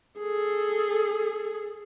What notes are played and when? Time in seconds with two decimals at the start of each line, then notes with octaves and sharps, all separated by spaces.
0.19 G#4 A4